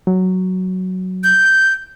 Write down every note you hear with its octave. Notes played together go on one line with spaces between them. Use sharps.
F#3
G6